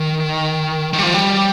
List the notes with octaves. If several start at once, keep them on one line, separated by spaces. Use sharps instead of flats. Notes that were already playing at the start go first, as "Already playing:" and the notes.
Already playing: D#3
D#3
G3
F3
G3